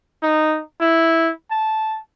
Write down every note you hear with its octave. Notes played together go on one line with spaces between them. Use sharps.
D#4
E4
A5